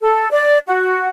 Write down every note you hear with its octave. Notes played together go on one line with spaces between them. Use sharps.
A4
D5
F#4